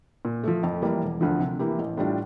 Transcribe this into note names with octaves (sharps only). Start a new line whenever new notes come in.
A#2
F3 A3
F2
E3 G3 A#3
E1
D2 D3 F3
C3
E3 A#3 E4 G4
A1
A2 G3 D4 F4